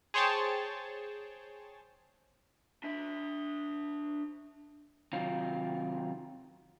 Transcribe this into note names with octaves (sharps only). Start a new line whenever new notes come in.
G#4 C5 C#5 G5 A5
D4 E5
C3 D#3 F#3 F4